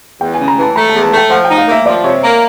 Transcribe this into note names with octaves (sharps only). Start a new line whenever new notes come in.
E2 G5
C#3 G#5
A#5
E3 A5
A3 A#5
E2 A5
A5
A3
G5
F3 F#5
D#4 G5
F5
A#3 E5
F3 D5
C3 C#5
A#3